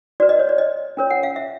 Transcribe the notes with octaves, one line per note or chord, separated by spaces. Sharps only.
F#4 B4 D5
D#5
C#5
D5
D#5
C#4 F4 A#4 C#5
F#5
F5
E5